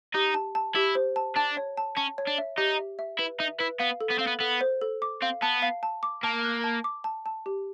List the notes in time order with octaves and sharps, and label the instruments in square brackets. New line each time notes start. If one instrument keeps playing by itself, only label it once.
[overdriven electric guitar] D#4 [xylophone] G4
[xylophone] A5
A5
[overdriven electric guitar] E4 [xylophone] G4
[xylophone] C5
A5
[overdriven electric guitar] D4 [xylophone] A5
[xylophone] C#5
A5
[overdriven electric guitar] C#4 [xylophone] A5
[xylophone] C#5
[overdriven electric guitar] D4
[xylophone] E5
[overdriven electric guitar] D#4 [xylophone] G4
[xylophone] E5
E5
[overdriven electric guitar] E4 [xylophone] B4
[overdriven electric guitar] D#4 [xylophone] E5
[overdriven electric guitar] E4 [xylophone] B4
[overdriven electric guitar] B3 [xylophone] F5
[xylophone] A4
[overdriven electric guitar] B3
[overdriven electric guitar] C4 [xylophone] F5
[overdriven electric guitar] B3
[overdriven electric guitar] B3 [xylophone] A4
[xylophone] C5
A4
D6
[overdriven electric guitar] C4 [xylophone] F5
[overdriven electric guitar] B3 [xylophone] A5
[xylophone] F5
A5
D6
[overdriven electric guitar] A#3 [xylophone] A5
[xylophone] F#6
A5
D6
A5
A5
G4